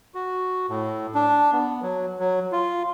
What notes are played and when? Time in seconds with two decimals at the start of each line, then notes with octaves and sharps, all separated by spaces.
0.15 F#4
0.69 A2
1.15 D4
1.53 B3
1.82 F#3
2.20 F#3
2.52 F4